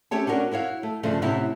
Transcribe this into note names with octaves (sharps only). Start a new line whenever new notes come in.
A3 C#4 G4 C#5 A5
C#4 D4 F#4 A#4
E4 F#4 C#5 F5
A3
G2 C#3 F3 A3
A2 C3 B3 C#4 E4